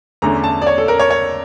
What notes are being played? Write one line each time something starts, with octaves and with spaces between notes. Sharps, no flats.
E2 D3 A3 C#4 A#5
A5
D5
C#5
A4
A#4
C#5
C#5